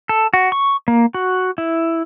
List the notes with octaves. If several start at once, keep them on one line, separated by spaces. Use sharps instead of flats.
A4
F#4
C#6
A#3
F#4
E4